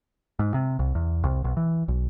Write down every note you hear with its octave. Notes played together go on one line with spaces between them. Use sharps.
G#2
C3
C2
E2
C2
B1
E3
B1